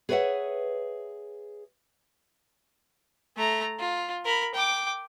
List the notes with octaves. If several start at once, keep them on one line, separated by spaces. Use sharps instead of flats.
G#4 B4 C#5 D5 E5 F#5
A3 A#5
F4
A#4 B5
G5 D6